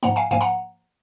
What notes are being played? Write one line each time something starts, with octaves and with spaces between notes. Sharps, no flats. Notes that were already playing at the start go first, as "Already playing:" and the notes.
G#2 F3 A#3 F#5 A#5
F5 G#5
G#2 F3 A#3 F5 G#5
F#5 A#5